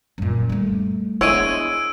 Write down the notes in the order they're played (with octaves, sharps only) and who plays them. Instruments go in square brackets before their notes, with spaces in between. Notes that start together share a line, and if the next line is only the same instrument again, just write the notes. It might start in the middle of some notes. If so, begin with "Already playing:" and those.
[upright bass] F#2 A#2
G3 A3
[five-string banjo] G#3 E4 C#5 [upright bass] B3 D4 [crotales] E6 D7 D#7